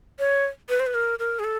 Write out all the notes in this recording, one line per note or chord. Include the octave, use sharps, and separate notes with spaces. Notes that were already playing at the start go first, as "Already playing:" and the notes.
C#5
B4
C5
B4
A#4
A#4
G#4
A4